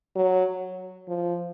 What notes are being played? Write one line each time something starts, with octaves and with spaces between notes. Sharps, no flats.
F#3
F3